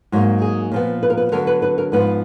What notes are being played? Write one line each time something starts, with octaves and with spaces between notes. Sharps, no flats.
G#2 F#3 A#3
G#4
A#2 F3 B3
B4
A#4
B4
D3 F#3 B3 A#4
B4
B4
A#4
G#2 F3 B3 B4